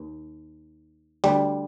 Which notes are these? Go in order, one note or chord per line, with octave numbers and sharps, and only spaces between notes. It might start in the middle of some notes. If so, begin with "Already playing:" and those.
Already playing: D#2
D2 D3 G3